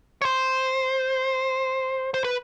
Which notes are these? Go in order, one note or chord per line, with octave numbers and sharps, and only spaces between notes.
C#5
C5
C5
B4